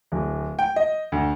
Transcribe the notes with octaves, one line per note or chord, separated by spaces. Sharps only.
D1
G5
D#5
D2